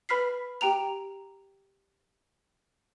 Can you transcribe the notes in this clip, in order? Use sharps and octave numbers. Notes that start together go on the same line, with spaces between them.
B4 B5 F6 B6 C7
G4 G5 A#5 F7